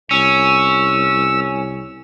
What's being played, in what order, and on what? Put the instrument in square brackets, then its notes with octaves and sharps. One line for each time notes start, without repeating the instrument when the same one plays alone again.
[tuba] C2 [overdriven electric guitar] C#4 [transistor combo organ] E6